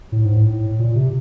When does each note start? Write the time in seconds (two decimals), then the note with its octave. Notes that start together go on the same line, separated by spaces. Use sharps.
0.12 A2
0.25 G#2
0.36 A2
0.79 A#2
0.95 C3